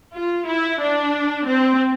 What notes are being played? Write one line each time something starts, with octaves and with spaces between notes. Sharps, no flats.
F4
E4
D4
C4